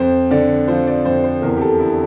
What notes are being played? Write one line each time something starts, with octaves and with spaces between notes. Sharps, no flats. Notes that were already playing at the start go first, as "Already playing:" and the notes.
Already playing: F2 C5
D3 D5
F3 C5
D5
F2 C5
C5
E2 A#4
G4
A4
D3 E4